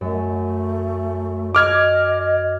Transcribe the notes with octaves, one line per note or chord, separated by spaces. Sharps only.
F#2 A3
D#5 D6 F6 G#6